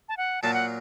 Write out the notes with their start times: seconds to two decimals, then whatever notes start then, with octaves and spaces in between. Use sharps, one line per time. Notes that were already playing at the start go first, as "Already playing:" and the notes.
0.09 A5
0.17 F#5
0.42 A#2 F#3 A#3 A5
0.54 F#5